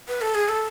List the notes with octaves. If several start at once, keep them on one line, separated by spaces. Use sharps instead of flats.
B4
A4
G#4
A4